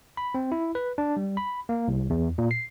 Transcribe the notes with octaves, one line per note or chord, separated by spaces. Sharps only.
B5
C4
E4
B4
D4
G3
B5
A#3
C2
E2
A#2
C7